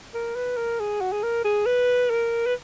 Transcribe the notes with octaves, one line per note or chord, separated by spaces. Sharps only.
A#4
B4
A#4
G#4
F#4
G#4
A#4
G#4
B4
A#4
B4